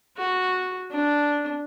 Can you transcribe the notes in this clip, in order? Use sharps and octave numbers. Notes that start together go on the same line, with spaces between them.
F#4
D4